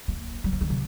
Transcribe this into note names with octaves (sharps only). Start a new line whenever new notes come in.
A#3
G3
F3
D#3
C3